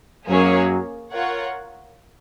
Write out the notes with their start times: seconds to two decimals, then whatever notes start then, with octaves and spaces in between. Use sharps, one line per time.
0.27 F#2 F#3 A#3 C#4 G#4 C#5
1.11 F4 A#4 C#5 F#5